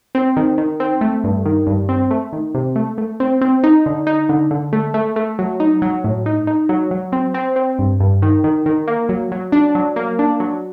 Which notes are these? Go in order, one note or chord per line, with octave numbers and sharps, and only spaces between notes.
C4
D#3
D#3
C4
A3
G2
D#3
G2
C4
A3
D#3
C3
A3
A3
C4
C4
D#4
D3
D#4
D3
D3
A3
A3
A3
F#3
D#4
F#3
A2
D#4
D#4
F#3
F#3
C4
C4
C4
G2
G2
D#3
D#3
D#3
A#3
F#3
F#3
D4
F#3
A#3
D4
F#3